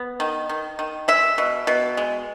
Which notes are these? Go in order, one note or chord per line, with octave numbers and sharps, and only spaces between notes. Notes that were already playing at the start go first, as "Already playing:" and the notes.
Already playing: B3
D#3
D#3
D#3
G#3 E5
B2
B2
G#3